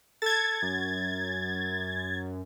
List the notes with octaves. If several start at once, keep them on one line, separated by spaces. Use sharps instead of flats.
A4 G#6 A6
F#2